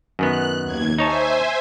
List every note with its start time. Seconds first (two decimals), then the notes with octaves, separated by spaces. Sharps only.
0.19 F#2 D#3 B3 F#6
0.63 D#2 G#6
0.98 D#4 C5 C#5 E5 G#5 A5